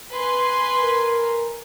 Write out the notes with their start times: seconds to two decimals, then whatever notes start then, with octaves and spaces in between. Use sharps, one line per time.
0.15 B4 G#5 C6
0.83 A#4